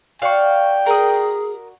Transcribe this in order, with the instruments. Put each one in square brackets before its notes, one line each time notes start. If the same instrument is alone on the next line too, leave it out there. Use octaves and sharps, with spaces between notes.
[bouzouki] F#4 D5 [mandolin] F5 C#6 [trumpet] G5
[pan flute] G#4 [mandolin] A#4 D#6